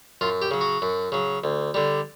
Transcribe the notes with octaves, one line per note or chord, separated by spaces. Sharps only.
F#2 F4
G4
C#3 F#3
F#4
F#2
C#3 F#3
D2
D3 G3